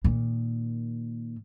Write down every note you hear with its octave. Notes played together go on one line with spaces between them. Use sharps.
A#2 D#3